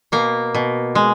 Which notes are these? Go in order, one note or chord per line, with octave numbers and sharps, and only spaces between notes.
B2 A#3
B2
G#3